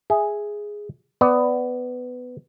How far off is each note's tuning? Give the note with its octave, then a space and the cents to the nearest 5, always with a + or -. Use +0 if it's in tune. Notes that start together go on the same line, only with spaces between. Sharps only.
G#4 +0 E5 +0
B3 +15 D5 +0